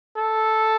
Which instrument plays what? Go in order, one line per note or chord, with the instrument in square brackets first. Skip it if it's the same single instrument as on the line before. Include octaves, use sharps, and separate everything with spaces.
[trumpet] A4